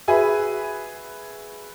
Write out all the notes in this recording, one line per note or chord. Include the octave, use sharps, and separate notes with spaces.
F#4 G#4 B4 E5 G#5